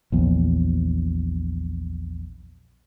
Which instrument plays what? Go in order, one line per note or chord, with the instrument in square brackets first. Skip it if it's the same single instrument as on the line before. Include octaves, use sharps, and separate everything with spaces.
[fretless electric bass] A#1 E2